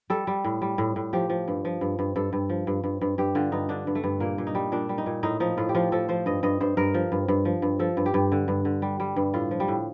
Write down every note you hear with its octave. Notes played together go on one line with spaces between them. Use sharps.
G3 A4
G3
A2
G3
A2
A2
F3 G4
F3
G2
F3
G2
G2
G2 A4
G2
F3
G2
G2
G2
G2 G4
D3 F4
G2 D#4
D3 D4
G2
A3
G2
A#2 A#3
A#2
D#4
G3
A#2 D4
G3
D#4
A#2
A2 D#4
F3 D#4
A2 F4
G4
F3 F4
F3 A4
F3 C5
G2 D#5
G2 D#5
G2 C5
G2 A#4
F3
G2
G2
F3
G2
F3 A4
G2
G4
G2
D3
G2
D3
G3
G3
G2
A2 F4
F3
G3
A2